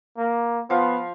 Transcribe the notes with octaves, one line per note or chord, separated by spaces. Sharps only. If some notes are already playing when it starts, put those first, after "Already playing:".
A#3
F3 B3 F5